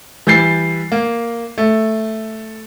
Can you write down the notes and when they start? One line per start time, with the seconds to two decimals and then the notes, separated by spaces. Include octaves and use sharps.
0.27 E3 G3 G6 A6 C7
0.92 A#3
1.58 A3